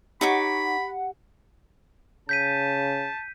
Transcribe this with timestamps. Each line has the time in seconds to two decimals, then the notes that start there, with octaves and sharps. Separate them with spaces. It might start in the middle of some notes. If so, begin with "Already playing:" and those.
0.21 D#4 G4 C#5 F#5 B5 D6
2.29 C#3 A5 G6 B6 D#7